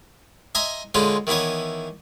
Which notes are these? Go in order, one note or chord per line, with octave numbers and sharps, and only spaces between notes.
D#5 E5 G#5 A#5 C6
D3 G#3 C#4 F4 B4
D#3 E3 B3 E4 C#5